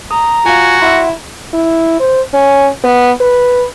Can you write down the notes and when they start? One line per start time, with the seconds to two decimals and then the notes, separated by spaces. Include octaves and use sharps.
0.11 A#5 D#6
0.46 F4 F#4 F5 G#5
0.82 E4 E5 F#5 C6
1.53 E4
2.00 C5
2.33 C#4
2.84 B3
3.21 B4